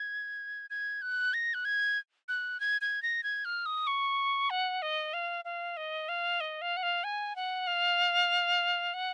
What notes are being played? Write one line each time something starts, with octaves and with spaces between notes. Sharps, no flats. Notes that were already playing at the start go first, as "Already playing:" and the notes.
Already playing: G#6
G#6
F#6
A#6
F#6
G#6
F#6
G#6
G#6
A#6
G#6
F6
D#6
C#6
F#5
D#5
F5
F5
D#5
F5
D#5
F5
F#5
F5
G#5
F#5
F5
F#5